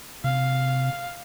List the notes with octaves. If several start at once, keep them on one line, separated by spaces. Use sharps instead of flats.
C3 F5